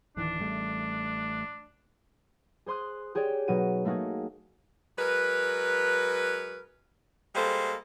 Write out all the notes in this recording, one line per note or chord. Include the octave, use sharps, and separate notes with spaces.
D1 D#3 E3 D4
A1 G3 A3
G#4 C5 C6 D#6 F#6
G4 G#4 C#5 D5 G5
B2 F#3 D#4 F#4 D#7
A3 A#3 D#4 F#4 G#4
F#3 G#3 A#4 B4
G3 G#3 A#3 A4 C5